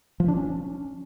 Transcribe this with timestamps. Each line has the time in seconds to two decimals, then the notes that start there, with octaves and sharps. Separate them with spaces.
0.20 F3
0.28 D4
0.37 C#4